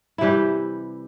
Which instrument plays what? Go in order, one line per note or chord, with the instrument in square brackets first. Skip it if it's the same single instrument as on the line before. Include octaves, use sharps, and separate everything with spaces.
[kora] C3 E3 G3 E4 G4